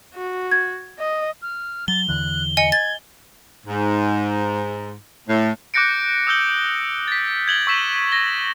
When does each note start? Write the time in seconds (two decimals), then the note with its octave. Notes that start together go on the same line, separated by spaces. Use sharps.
0.14 F#4
0.52 G#6
0.99 D#5
1.42 F6
1.88 F#3 A6 G7
2.08 E2 D3 E3 F#6
2.57 D#5 G#5 C#7
2.72 G#6 A6
3.66 G#2
5.28 A2
5.74 D6 F#6 G6 A#6 C#7 D7
6.27 D#6 E6 G6 G7
7.08 A6 B6
7.48 G#6 F#7 G7
7.67 C#6 E6 B6 E7
8.12 A#6 G7